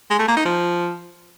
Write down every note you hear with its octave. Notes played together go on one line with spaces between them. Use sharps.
G#3
A3
A#3
D#4
F3